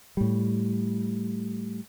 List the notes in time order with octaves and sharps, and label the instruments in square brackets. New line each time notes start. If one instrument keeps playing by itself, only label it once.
[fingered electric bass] A2 G3